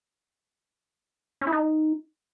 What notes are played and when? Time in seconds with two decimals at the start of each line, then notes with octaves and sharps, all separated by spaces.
1.41 C#4
1.47 E4
1.52 D#4